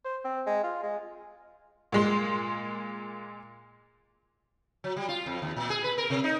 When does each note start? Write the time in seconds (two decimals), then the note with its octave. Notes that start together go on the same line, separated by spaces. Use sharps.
0.05 C5
0.24 C4
0.46 G#3
0.63 F4
0.83 G#3
1.92 A#2 G#3 C6
4.84 F#3
4.97 G3
5.08 F4
5.26 F2
5.42 D#2
5.57 A#2
5.70 G#4
5.84 B4
5.98 A#4
6.10 C3
6.24 D#4